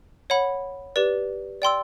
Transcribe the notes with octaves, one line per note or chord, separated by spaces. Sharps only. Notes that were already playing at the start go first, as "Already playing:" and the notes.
C#5 F#5 B5
G4 B4 D5
D5 G5 C6 E6